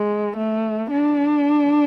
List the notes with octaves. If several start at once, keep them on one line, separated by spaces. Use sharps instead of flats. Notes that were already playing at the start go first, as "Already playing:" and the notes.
Already playing: G#3
A3
D4